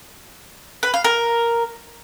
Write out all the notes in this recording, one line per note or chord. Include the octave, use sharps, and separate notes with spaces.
B4
F5
A#4